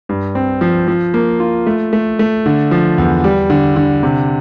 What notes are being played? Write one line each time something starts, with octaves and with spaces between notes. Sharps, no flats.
G2
C4
F3
F3
A#3
F4
A3
A3
A3
D3
F3
E2
G3
D3
D3
C3